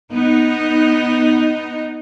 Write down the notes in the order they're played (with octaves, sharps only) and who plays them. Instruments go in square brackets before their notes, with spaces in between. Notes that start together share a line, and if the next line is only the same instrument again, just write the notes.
[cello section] B3 D#4